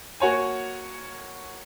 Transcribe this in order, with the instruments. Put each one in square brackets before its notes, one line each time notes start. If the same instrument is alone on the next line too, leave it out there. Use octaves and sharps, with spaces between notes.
[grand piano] A#3 F#4 C#5 G#5